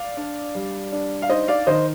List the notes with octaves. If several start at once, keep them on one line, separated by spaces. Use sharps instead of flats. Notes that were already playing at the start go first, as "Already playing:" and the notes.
Already playing: D5 F5
D4
G3
D4
F5
D#4 C5 D#5
D5 F5
D#3 C5 D#5